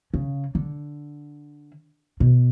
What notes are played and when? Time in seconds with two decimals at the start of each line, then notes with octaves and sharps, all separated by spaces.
0.14 C#3
0.55 D3
2.20 B2